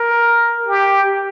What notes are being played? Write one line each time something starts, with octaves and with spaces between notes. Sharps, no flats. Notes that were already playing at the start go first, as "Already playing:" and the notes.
Already playing: A#4
G4